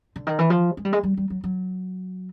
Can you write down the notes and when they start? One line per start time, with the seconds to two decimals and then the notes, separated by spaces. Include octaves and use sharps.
0.16 D3
0.27 D#3
0.39 E3
0.50 F3
0.77 G#3
0.85 G3
0.93 G#3
1.03 G3
1.17 G3
1.30 F#3
1.44 F#3